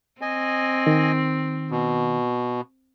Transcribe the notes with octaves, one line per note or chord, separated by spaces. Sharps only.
C4 D#5 G#5
D#3
B2